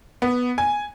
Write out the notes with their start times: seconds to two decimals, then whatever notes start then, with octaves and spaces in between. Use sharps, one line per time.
0.22 B3
0.58 G#5